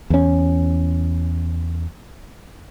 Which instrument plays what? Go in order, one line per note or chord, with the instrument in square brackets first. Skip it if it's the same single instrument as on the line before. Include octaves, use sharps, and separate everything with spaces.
[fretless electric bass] E2 C#4